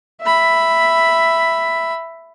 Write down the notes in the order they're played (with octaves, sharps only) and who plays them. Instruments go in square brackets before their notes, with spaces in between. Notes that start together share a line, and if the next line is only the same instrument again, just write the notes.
[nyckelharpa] E5 B5